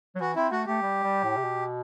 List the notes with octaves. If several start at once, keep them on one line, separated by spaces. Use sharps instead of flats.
F#3
E3 F#4
C4 E4
A3 F#4
A3 G4
G3
G3
A2
C3
B2